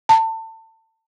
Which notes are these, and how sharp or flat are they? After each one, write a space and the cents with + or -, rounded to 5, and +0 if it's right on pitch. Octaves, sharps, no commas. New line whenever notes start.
A5 +30